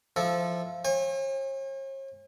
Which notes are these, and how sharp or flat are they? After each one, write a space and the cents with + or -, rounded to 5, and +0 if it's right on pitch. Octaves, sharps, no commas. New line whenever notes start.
F3 -10 E4 +0 A4 -10
C#5 -45 G#5 -40